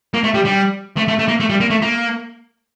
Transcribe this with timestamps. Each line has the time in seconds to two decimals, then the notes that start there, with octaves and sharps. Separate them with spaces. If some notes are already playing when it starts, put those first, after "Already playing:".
0.14 A#3
0.24 A3
0.34 G3
0.45 G3
0.97 A3
1.08 A3
1.19 A3
1.28 A#3
1.40 A3
1.50 G3
1.60 A#3
1.70 A3
1.82 A#3